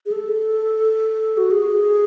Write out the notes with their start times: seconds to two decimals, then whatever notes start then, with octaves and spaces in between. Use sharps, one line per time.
0.06 G#4
0.12 A4
1.37 F#4
1.51 G#4